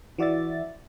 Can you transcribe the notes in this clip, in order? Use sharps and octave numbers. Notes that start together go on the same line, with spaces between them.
E3 F#4 D5 E5 A6